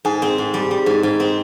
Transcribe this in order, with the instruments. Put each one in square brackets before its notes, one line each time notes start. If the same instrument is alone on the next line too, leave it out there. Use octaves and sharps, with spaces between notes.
[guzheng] G#2 [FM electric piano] G#4
[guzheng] C4
G#2
G3
G3
G#2
G#2
C4